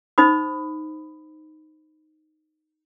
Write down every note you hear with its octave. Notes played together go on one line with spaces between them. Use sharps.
D#4 C5 B5 D#6